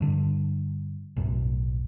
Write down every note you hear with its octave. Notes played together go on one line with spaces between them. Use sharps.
G2 D3
B1 F#2 A2